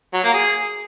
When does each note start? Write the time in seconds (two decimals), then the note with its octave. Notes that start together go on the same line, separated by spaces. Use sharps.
0.14 F#3
0.24 A#3
0.34 G#4